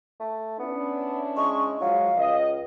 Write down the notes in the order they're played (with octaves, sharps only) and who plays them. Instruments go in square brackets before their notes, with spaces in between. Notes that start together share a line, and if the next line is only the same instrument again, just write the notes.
[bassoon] A3
[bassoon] B3 [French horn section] C#4 D4 E4
[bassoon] G#3 [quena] C#6
[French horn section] F3 G#3 [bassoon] F#3 [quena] F5
[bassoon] C#2 [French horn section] D#5